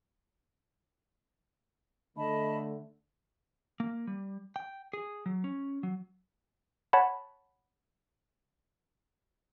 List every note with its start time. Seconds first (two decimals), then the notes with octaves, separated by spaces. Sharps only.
2.17 D3 A3 D#5 A5 B5
3.80 A#3
4.07 G3
4.56 G5
4.93 G#4
5.26 F#3
5.44 C#4
5.83 F#3
6.93 C#5 F#5 A5 B5